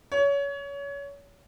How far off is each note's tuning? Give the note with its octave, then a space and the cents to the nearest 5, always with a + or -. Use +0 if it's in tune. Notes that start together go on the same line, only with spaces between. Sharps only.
C#5 +25